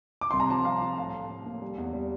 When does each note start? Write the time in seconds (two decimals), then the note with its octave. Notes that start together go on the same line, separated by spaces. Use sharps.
0.21 D6
0.31 C2 C6
0.40 A#5
0.50 F3 A5
0.65 C2 F5
0.81 F3
0.98 A2 F5
1.14 A2
1.30 A2
1.46 A#3
1.62 G3
1.78 E2
1.93 G3